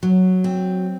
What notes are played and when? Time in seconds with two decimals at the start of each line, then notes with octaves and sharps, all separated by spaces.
0.03 F#3
0.44 C4